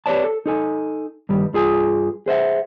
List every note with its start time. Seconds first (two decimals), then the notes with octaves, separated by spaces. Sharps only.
0.06 G4 B4 C#5 D5 A5
0.24 A4
0.46 D#4 A4 G#5
1.29 G2 D#3 G3
1.54 G2 F4 G#4 G#5
2.26 G#4 C5 E5 F#5